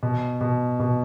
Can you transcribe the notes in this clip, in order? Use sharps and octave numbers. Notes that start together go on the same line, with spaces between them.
B2
B2
B2